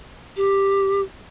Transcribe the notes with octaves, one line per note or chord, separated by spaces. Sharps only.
G4